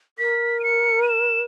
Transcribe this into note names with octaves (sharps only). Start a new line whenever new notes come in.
A#4 B6
D#7
C#7
D#7
E7